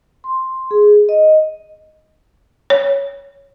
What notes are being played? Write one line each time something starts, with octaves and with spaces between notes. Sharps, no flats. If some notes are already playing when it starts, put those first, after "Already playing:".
C6
G#4
D#5
C#5